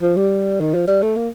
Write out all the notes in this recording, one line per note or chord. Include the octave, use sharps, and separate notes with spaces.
F3
G3
D#3
F3
G3
A3
A#3